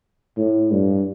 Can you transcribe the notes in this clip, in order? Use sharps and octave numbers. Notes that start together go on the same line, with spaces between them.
A2
G2